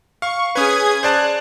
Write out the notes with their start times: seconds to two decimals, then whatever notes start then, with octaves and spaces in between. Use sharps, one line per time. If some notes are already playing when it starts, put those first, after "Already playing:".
0.22 F5 C#6
0.55 C#4 G#4 B4 D#6 G#6
1.03 C5 D5 A5 F#6